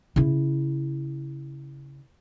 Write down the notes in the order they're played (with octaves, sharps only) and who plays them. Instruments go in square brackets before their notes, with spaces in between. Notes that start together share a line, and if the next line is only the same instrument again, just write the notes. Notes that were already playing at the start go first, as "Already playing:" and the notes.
[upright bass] C#3 E4